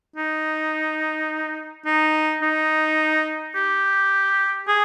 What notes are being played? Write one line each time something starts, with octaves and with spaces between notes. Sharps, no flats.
D#4
D#4
D#4
G4
G#4